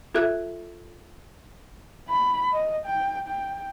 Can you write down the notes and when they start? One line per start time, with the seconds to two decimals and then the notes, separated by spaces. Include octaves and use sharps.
0.15 F4 A4 E5 F#6
2.08 B5
2.52 D#5
2.86 G5
3.27 G5